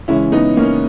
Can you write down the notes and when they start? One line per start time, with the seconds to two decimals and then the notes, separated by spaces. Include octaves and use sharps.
0.08 C#3 E3 G#3 C#4 E4
0.32 B3 D#4
0.56 A#3 C#4